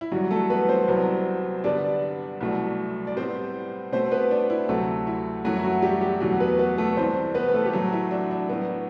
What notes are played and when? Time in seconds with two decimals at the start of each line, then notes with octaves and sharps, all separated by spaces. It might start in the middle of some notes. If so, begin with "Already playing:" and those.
0.01 E4
0.12 G2 E3 F#3 G3 F#4
0.31 A3 A4
0.50 B3 B4
0.69 C4 C5
0.88 C2 C3 F#3 B3
1.64 G2 D3 G3 B3 D4 D5
2.41 C2 B2 F#3 A3
3.07 D5
3.16 A2 G3 B3 C4 C5
3.92 B2 A3 C4 C5
4.11 B3 B4
4.31 D4
4.50 E4
4.69 D2 C3 F#3 A3 A4
5.07 E4
5.45 F#2 E3 F#3 A3 F#4
5.57 E4
5.63 F#3 F#4
5.82 G3 G4
6.01 G3 G4
6.20 E2 B2 F#3 A3 F#4
6.40 B3 B4
6.59 B3 B4
6.78 A3 A4
6.97 C2 C3 E3 A3 C4 C5
7.35 B3 B4
7.48 B4
7.54 A3 A4
7.65 G4
7.73 A2 E3 F#3 A3 F#4
7.93 E4
8.11 D4
8.31 D4
8.49 A2 F#3 B3